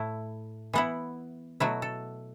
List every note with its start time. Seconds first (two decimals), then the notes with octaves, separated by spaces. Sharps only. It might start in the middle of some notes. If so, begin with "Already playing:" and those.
Already playing: A2 A3 E4
0.73 E3 B3 E4 F#5
1.60 B2 F#3 A3 E4 F#4
1.82 A4